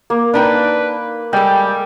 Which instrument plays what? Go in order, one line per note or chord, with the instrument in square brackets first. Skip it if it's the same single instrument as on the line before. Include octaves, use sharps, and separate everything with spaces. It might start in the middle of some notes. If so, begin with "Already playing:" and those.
[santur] A#3
[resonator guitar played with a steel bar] D4 D#4 G5 [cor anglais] B4
[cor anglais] G3 [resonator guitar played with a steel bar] G#3 A4 [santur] G5